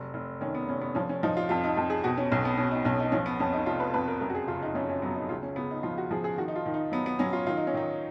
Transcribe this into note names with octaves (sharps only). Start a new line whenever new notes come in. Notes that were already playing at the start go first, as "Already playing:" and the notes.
Already playing: F1 F#3
F1
D#3 C#4
B3
F1 C#4
B3
F3 C#4
C#4
F3 D#4
F4
F2 F4
D#4
F2 F4
G#4
B2 F#4
C#4
B1 C#4
B3
B2 C#4
D#4
B1 C#4
D#4
F3 C#4
B3
F2 C#4
D#4
F1 F4
B4
F2 B4
A#4
F#2 A#4
F#4
G#4
F#1 F4
D#4
F#2 C#4
C#4
F#3 B3
D#4
C#2 F4
C#4
C#3 B3
D#4
F3 F4
F#4
F3 G#4
G#4
D#3 F#4
D#4
F4
D#3
D#4
F#3 B3
B3
F#3 C#4
F4
D#3 F4
D#4
C#4
D#3 D#4